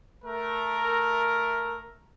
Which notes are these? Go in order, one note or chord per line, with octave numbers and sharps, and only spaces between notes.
A3 A#4